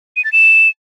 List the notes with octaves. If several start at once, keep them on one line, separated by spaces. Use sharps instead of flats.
D#7
A6
E7